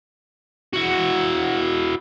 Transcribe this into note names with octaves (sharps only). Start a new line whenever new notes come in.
E4 F#4